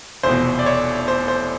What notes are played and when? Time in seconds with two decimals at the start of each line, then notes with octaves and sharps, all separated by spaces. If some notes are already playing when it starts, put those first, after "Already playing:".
0.23 F1 E2 B2 C5
0.59 D5
0.66 C#5
1.08 C5
1.28 C5